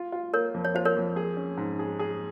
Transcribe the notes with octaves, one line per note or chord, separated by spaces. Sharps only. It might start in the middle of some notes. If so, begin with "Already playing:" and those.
Already playing: F4
F4
A#3 A#4 C#5
F2
C#5
F4 C5
A#4 C#5
F2
G#4
C#4
G#2
G#4
G#4